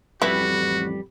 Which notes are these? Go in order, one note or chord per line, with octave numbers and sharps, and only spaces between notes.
A1 F2 G3 E4 F#4 B4